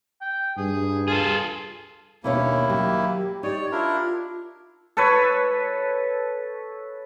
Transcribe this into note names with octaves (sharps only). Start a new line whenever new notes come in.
G5
G2 G#4
F4 G#4 A4
D#2 B2 A#3 C#4 D4 E4 C#5
F#3 G4
D#4 G4 C#5 D5
D4 E4 F4 A#4
A4 B4 C#5